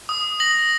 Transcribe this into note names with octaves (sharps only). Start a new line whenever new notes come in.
D#6
A#6 F#7